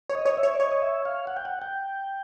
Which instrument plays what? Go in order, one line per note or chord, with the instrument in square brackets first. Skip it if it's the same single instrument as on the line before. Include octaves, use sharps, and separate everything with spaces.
[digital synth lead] C#5
[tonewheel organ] D#5
[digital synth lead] C#5
[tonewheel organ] E5
[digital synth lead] C#5
[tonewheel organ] D5
[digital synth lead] C#5 [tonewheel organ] D#5
[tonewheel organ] D#5
E5
F5
F#5
G5
F#5
G5